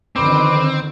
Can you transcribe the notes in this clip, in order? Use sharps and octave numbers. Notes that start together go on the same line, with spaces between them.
F2 D3 D#3 C4 B4 D6